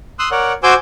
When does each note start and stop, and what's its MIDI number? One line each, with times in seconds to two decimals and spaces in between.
0.19 0.29 84
0.19 0.29 87
0.19 0.29 88
0.19 0.29 90
0.31 0.53 70
0.31 0.53 73
0.31 0.53 74
0.31 0.53 78
0.63 0.74 66
0.63 0.74 72
0.63 0.74 80
0.63 0.74 86
0.63 0.74 88
0.63 0.74 91